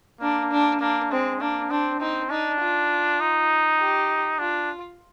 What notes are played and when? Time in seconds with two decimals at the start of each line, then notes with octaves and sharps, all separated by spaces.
0.21 A#3 D4
0.52 D4
0.80 A#3 D4
1.11 G#3 C4
1.40 A#3 D4
1.70 C4 D4
2.00 C4 D#4
2.30 D4 D#4
2.60 F4
3.20 D#4
3.79 G4
4.39 D4 F4